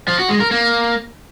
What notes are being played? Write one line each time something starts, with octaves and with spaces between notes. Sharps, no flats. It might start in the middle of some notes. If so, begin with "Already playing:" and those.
F3
F#4
G#3
A#4
A#3